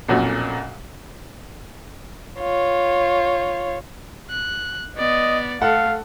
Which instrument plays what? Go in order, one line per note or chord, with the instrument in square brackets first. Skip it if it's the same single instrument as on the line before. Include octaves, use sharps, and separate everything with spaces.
[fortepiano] B1 F2 A#2 C#4 F#4
[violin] F4 C#5
[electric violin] F#6
[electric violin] B3 D5 [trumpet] D#5
[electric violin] A3 [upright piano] A4 F#5 [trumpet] F5